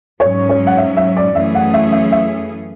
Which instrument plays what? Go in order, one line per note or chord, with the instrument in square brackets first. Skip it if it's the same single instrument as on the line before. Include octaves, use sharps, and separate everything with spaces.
[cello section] G#2 F#3 C#4 [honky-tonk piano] C#5
[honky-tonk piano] C#5
F#5
E5
E5
D5
[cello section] F#2 E3 A3 C#4 G#4 [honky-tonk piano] E5
[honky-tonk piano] F#5
E5
E5
E5